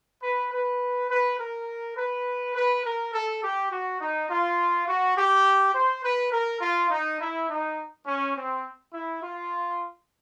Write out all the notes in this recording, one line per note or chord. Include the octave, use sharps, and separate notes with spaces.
B4
B4
B4
A#4
B4
B4
A#4
A4
G4
F#4
D#4
F4
F#4
G4
C5
B4
A#4
F4
D#4
E4
D#4
C#4
C4
E4
F4